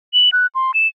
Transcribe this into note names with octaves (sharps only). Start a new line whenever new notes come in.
F#7
F#6
C6
E7